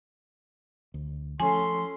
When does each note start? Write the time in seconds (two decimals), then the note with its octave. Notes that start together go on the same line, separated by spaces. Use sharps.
0.94 D2
1.40 F3 A3 C#4 A4 G#5 C6